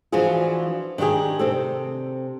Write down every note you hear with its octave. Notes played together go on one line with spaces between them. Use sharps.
E3 F3 D4 F4 F#4 G#4
D#3 D4 F4 G4 G#4
C3 C4 A4